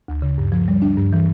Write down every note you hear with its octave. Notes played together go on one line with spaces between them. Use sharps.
D2
C#3
G2
F3
G3
D4
G2
E3